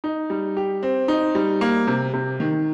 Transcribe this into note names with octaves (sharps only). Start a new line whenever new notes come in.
D#4
G3
G4
C4
D#4
G3
A#3
C3
C3
D#3